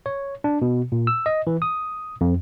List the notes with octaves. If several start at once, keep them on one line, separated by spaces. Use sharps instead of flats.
C#5
D4
B2
A#2
E6
D#5
E3
D#6
F2